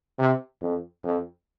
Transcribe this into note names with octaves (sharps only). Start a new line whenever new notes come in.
C3
F2
F2